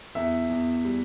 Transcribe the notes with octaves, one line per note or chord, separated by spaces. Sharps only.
E2 E5
E2
G3